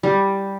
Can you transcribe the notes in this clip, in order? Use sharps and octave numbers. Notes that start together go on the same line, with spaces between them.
G3